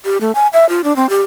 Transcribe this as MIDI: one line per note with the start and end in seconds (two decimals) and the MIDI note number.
0.05 0.18 67
0.21 0.32 57
0.35 0.47 80
0.53 0.68 76
0.69 0.81 65
0.84 0.95 62
0.96 1.09 60
1.09 1.22 67